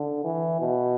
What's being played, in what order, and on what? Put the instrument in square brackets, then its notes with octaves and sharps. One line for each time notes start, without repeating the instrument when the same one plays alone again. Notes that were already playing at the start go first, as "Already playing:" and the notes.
Already playing: [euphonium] D3
E3
B2